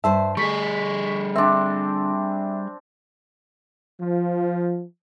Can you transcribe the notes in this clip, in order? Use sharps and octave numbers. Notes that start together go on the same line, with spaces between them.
G2 C5 E5 A5
D3 G3 G#4 C#6 B6
C4 D4 E5
F3